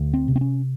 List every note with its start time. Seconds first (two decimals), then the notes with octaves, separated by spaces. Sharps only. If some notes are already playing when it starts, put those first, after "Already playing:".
Already playing: D2
0.14 C4
0.28 C3
0.36 C4
0.41 C#4